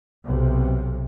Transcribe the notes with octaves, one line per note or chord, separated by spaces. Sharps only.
B1 C3